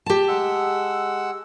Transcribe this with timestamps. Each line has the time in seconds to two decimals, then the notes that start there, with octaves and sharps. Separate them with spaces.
0.06 G4 A5
0.28 G#3 F#5 E6